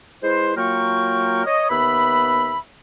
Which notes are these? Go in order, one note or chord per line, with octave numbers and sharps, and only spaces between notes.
G#3 E4 B4 C5
F#3 A#3 F4 A#4 G5 C#6
C#5 D#5
D#2 B3 B4 E5 B5